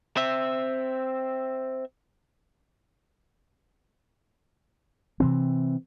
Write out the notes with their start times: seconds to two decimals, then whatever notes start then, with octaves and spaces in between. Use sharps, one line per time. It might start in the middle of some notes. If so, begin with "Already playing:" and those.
0.17 C4 E5
5.20 C3 E3 C4